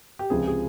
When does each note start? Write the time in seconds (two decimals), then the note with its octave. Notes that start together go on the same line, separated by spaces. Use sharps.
0.19 G4
0.30 C#2 C3 F3 G#4
0.47 G#4